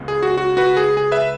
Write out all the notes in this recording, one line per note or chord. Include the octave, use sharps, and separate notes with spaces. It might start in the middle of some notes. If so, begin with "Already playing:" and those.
Already playing: C#2 C#3 G#3 B3
G#4
F#4
F#4
F#4 B4
G#4
G#4
B4 E5